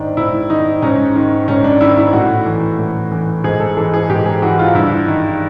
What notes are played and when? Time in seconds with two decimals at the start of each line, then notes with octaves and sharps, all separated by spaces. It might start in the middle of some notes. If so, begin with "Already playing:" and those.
Already playing: G#2 D#3 D4
0.17 G#2 E4
0.50 D#3 D#4
0.82 G#2 C#4
1.16 D#3
1.48 G#2 C#4
1.64 D4
1.81 D#3 E4
1.97 E4
2.13 A2 F#4
2.46 E3
2.79 A2
3.12 E3
3.44 G#2 G#4
3.60 A4
3.77 E3 A4
3.94 G#4
4.09 G#2 G4
4.26 G#4
4.42 E3 F#4
4.59 F4
4.75 G2 E4
5.08 D#3